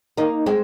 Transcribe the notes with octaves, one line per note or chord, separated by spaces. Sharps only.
A#3 D#4
G#3 C4